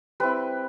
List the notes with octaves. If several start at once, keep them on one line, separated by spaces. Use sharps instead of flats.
G3 C4 E4 B4